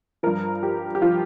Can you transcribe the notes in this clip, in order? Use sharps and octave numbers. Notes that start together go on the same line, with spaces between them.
G2 F3 A#4
G4
G4
F3 F4